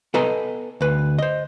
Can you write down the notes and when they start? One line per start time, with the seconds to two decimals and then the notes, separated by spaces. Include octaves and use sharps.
0.14 B3 A4 B4 D#5 G#5 A#5
0.81 D2 B4
1.19 C5 D#5